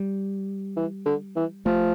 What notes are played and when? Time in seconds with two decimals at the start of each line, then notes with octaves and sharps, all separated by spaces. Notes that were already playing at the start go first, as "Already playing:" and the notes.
Already playing: G3
0.77 E3
1.06 D3
1.36 E3
1.66 F3 A3